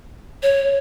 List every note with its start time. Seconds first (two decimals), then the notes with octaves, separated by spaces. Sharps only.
0.43 C#5